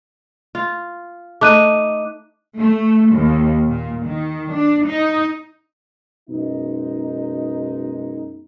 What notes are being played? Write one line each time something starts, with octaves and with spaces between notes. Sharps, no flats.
F4
A3 D#4 D6 F#6 D#7
A3
D#2
A#2
D#3
D4
D#4
F#2 B2 G#3 D#4